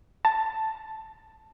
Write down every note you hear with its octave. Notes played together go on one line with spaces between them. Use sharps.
A5